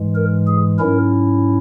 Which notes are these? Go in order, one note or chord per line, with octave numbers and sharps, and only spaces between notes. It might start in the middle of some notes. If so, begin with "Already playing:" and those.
Already playing: G#2 E3 G#3
A#4
G#4
G#2 F#3 C#4 E4 A#4